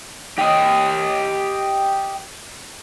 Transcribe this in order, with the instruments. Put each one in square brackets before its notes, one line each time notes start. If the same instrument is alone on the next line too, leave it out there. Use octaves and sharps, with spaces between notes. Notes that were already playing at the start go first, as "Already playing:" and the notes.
[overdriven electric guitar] G4 D#5